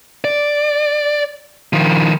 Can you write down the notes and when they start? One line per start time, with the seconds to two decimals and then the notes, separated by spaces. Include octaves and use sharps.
0.24 D5
1.73 D#3 F3